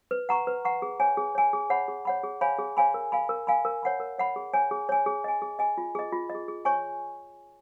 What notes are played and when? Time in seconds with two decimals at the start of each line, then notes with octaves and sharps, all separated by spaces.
0.11 B4
0.29 F#5 A#5 C#6
0.47 B4
0.65 F#5 A#5 C#6
0.82 G#4
1.00 C#5 G#5
1.17 G#4
1.35 C#5 G#5
1.53 G#4
1.70 C#5 F#5 B5
1.88 G#4
2.05 C#5 F#5 B5
2.23 G#4
2.41 C#5 F5 G#5 B5
2.59 G#4
2.77 C#5 F5 G#5 B5
2.94 A#4
3.12 F5 G#5 B5
3.29 A#4
3.47 F5 G#5 B5
3.65 A#4
3.83 C#5 F#5 B5
4.00 A#4
4.18 C#5 F#5 B5
4.36 G#4
4.54 C#5 G#5
4.71 G#4
4.89 C#5 G#5
5.06 G#4
5.24 D#5 G#5
5.42 G#4
5.59 D#5 G#5
5.78 F4
5.95 G#4 D#5
6.12 F4
6.30 D#5
6.35 G#4
6.48 G#4
6.65 C#5 G#5 C#6